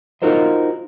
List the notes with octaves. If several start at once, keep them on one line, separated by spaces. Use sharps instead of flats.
D#4 F4 F#4 A#4 C5 D#5